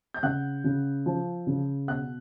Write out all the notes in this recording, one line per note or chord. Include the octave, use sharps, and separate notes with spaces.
G6
C#3 F#5 F#6
C#3
F3
C#3
B2 F#5 F#6